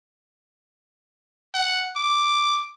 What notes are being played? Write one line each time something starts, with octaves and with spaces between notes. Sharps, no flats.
F#5
D6